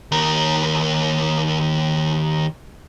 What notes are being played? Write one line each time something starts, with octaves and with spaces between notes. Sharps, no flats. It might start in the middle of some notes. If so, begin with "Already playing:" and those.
D#2 A#4